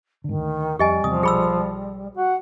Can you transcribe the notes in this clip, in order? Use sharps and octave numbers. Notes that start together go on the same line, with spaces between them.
G#2 D3 D#3
D2
F2 G3 G4 D#5 G#5
E2 C3 F3 D#6
B1 G#4 B5 E6
F#4 F#5